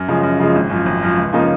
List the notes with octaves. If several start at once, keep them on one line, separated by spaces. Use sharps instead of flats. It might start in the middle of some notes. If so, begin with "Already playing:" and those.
Already playing: F#2
C#3 F3 G#3
F#2
C#3 F3 G#3
G#1
F#2 F3
G#1
F#2 F3
C#2
C#3 F3 A#3 D#4